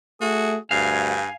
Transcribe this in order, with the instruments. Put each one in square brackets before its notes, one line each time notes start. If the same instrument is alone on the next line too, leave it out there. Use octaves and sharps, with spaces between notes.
[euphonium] A3 [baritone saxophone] F#4 [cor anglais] G#4
[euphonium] D2 [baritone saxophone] G2 [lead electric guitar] F5 [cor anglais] G#5